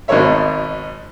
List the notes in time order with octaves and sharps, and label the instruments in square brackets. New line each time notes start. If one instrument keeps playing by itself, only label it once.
[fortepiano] G#1 G#2 B2 A#4 C#5 E5